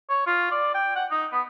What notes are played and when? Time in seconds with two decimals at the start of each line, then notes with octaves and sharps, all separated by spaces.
0.09 C#5
0.27 F4
0.51 D5
0.74 G5
0.96 F#5
1.11 D#4
1.32 B3